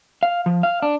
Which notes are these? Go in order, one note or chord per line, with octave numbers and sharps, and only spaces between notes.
F5
F3
F5
D4